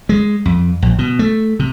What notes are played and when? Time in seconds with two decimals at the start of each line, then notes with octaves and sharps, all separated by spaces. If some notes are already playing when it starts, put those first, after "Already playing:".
0.09 G#3
0.46 F2
0.82 A#1
0.99 B2
1.19 A3
1.59 C3